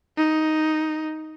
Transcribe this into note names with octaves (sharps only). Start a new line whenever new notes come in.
D#4